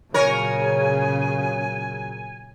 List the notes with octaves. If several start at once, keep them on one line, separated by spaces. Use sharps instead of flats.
A#2 C#3 F#3 A#4 C#5 G#5